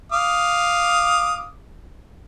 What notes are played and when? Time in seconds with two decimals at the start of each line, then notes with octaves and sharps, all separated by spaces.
0.12 F5 D6 D#6